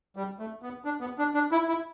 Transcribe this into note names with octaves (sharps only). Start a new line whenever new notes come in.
G3
A3
B3
D4
B3
D4
D4
E4
E4